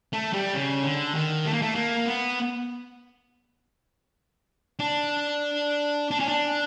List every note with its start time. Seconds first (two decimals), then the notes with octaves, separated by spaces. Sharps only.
0.13 A3
0.33 G3
0.54 C#3
0.83 D3
1.15 D#3
1.45 A3
1.53 A#3
1.62 A3
1.75 A#3
2.06 B3
4.79 D4
6.11 D4
6.20 C#4
6.28 D4